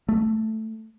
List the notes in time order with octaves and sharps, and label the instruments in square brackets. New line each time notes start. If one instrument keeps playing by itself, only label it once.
[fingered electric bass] A3